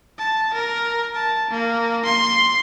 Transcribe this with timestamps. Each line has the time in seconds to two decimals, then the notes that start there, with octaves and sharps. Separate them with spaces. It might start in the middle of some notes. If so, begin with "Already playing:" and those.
0.18 A5
0.54 A#4
1.15 A5
1.51 A#3
2.05 C6